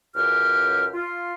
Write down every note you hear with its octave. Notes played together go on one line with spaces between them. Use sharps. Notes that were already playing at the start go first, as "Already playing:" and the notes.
C#2 F#2 G4 F6
F4